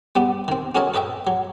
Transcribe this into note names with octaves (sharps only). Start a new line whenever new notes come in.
G3 B3 D4
D#3 C4
C#4 F#4 A4 A#4 C#5 D#5
A4 B4 D#5 E5 G5
F#3